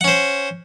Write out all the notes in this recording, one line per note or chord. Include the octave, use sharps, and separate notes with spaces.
C#4 C5 F#5